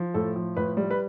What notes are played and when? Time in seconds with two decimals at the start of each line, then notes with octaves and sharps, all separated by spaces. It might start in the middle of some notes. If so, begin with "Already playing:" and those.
Already playing: F3
0.14 A2 A4
0.36 F3
0.57 A2 B4
0.77 G3
0.91 B4